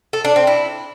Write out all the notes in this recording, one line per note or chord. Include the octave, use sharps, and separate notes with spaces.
A4
D4
C4
E4